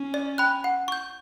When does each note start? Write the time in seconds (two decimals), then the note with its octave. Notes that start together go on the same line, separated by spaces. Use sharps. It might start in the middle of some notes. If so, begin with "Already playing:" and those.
Already playing: C#4
0.14 D5
0.38 G5 B5 F#6
0.64 F#5
0.88 C#6 G6